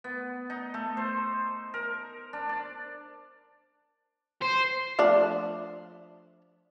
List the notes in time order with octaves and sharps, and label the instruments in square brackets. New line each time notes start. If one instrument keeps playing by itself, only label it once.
[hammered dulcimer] B3
D#4
A3
C5
A#4
D4
D5
[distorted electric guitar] C5
[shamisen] F3 A3 D4